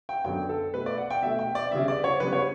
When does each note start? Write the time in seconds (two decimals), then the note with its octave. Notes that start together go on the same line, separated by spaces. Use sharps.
0.09 G5
0.25 F#2 D3 F#3 B3 G5
0.49 A4
0.74 B2 A3 B4
0.86 D5
0.98 F#5
1.10 G5
1.22 B2 A3 E5
1.39 G5
1.55 D5
1.71 C#3 G3 B3 E5
1.88 D5
2.04 C#5
2.20 C#3 G3 B3 B4
2.33 C#5